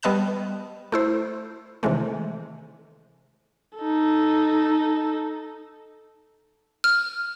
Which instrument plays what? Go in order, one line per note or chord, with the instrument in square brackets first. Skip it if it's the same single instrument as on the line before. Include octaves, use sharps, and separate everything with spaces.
[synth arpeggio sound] G3 B3 D#5 A5 F#6 E7
A3 E4 C5
C3 D#3 E3 G#3 A3
[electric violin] D#4 A4
[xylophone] F6